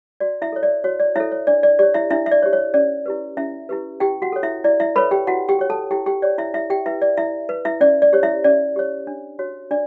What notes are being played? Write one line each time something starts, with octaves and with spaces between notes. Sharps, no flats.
F#4 D5
E4 E5
A4 C#5
D5
F#4 C#5
D5
E4 A4 C#5 E5
C#5
D4 D5
D5
G4 C#5 D5
E4 E5
D4 E4 E5
E5
D5
C#5
G4
C#5
C#4 D5
E4 G4 B4
C#4 E4 E5
E4 G4 B4
E4 G4 G5
F#4 F#5
A4 C#5
E4 E5
E4 D5
E4 E5
A4 B4 C#5 B5
G4 G5
E4 F#4 F#5
G4 G5
G4 C#5
A4 A5
E4 G4 G5
G4 G5
G4 C#5 D5
E4 E5
E4 E5
G4 G5
E4 B4 E5
D5
E4 E5
B4
E4 E5
C#4 D5
D5
G4 C#5
E4 E5
C#4 D5
G4 C#5
D4
F#4 C#5
D4 D5